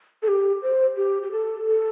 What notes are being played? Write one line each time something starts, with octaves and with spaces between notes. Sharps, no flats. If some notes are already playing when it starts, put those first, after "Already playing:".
A4
G4
C5
G4
G4
A4
A4